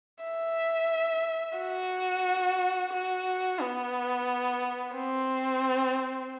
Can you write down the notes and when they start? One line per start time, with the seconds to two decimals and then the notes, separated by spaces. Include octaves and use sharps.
0.25 E5
1.59 F#4
2.94 F#4
3.61 B3
4.95 C4